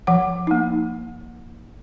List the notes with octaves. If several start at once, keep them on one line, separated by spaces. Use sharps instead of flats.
F3 F#5
A#3 D#4